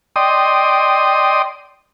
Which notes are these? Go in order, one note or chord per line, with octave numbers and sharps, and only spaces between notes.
D5 D#5 G5 C6 D#6